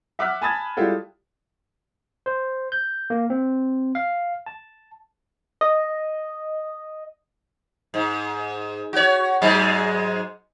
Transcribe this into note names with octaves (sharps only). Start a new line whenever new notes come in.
E5 F#5 D6 F6 F#6 B6
G#5 A5 B5 D#6 G#6 A6
G3 G#3 E4 F4 G4 A4
C5
G6
A#3
C4
F5
A5
D#5
G#2
F#4 C#5
G#2 F#3 G#3